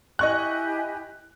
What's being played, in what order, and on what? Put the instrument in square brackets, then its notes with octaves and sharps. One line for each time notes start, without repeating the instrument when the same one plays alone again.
[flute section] E4 G4 G#5 [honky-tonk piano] D#5 C#6 F#6